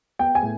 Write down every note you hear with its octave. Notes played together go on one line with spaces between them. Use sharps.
B3 G5
G#5
A2